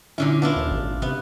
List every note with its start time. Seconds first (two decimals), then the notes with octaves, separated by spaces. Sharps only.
0.18 A#2 D3 C#4 E4
0.42 B3 D4 E4 F4
0.56 D#2
0.71 G#1
1.02 C3 B3